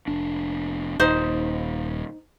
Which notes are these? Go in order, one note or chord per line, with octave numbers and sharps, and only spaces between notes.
F1 D4
D#1 D#4 C5